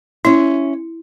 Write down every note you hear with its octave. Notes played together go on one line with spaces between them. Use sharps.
C#4 E4 E5